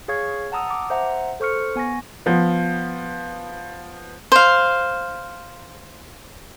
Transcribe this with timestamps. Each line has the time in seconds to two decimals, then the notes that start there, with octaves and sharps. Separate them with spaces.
0.08 G#4 C#5 F5 C#6 G#6
0.52 F#5 A5 A#5 D#6 E6
0.68 A5 D6
0.90 C5 E5 F#5 A#5
1.40 A4 C5 C#6 F6 C#7
1.76 B3 G#5 C#6 A#6
2.26 F3 B3
4.32 C5 F5